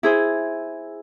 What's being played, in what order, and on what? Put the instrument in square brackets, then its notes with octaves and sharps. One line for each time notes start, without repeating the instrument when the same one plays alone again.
[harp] E4 G#4 C5